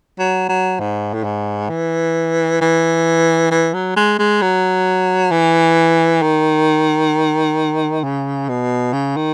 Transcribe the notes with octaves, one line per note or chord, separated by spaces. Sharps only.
F#3
F#3
G#2
A2
G#2
E3
E3
E3
F#3
G#3
G#3
F#3
E3
D#3
C#3
B2
C#3
D#3